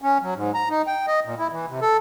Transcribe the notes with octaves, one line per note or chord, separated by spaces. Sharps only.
C#4
F#3
G#2
A#5
D#4
G5
D#5
A#2
E4
E3
C3
A4